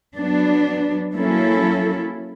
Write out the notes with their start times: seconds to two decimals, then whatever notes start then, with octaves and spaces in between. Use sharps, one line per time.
0.15 F#3 B3 D4
1.14 F#3 A#3 C#4 E4 A4